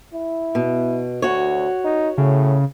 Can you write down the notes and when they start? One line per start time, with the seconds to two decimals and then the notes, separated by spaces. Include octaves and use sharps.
0.14 E4
0.55 B2
1.22 D2 F#4 C#5
1.84 D#4
2.18 A2 C#3